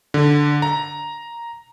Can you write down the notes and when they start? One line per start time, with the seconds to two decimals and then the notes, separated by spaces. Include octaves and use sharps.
0.14 D3
0.62 A#5